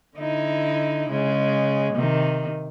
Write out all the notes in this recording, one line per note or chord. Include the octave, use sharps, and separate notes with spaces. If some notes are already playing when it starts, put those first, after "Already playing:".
D3 D#4 E4
C#3 G#3
C3 D#3